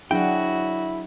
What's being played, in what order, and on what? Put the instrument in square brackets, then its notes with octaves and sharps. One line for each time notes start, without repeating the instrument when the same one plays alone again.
[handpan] F#3 D4 G#4 [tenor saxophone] E4 [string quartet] F#4 [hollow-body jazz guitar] F#5 G5